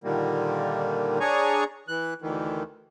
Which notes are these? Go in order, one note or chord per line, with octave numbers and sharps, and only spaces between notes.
A#2 D3 D#3 G3 A#3
D4 G#4 C#5 G#5 A#5 C#6
E3 F#6
D2 D#3 E3